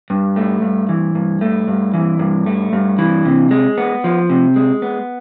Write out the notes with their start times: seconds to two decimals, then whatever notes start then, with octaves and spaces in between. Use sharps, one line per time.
0.10 G2
0.36 A3
0.62 G2
0.89 E3
1.15 G2
1.41 A3
1.68 G2
1.94 E3
2.19 G2
2.46 A3
2.73 G2
2.98 E3
3.25 C3
3.51 G#3
3.78 B3
4.04 F3
4.30 C3
4.56 G#3
4.82 B3